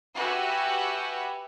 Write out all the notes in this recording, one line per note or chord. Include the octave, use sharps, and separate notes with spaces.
F#4 G4 B4 E5 F#5 G#5